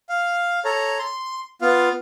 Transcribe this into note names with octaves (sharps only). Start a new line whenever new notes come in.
F5
A4 C#5 A#5
C6
B3 F4 F5